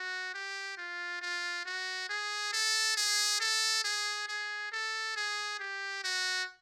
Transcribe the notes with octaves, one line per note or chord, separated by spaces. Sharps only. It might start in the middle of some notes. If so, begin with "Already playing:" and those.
Already playing: F#4
G4
F4
F4
F#4
G#4
A4
G#4
A4
G#4
G#4
A4
G#4
G4
F#4